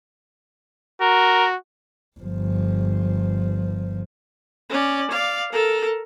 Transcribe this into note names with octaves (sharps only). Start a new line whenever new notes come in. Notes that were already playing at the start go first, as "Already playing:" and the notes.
F#4 A#4
G1 F3
C#4 D5
D5 F5
A4 A#4